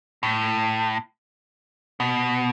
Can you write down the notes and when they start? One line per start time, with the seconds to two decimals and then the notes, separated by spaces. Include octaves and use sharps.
0.23 A2
2.00 B2